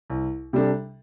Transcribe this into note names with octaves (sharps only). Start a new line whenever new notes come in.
C2
C3 G3 D4 A4